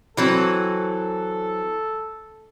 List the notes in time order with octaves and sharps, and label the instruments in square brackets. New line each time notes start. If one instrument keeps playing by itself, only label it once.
[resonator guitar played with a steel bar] E3 F#3 C4 [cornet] A4